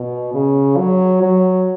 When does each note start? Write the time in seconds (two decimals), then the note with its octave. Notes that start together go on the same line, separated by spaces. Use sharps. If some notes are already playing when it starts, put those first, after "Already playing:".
Already playing: B2
0.34 C#3
0.77 F#3
1.22 F#3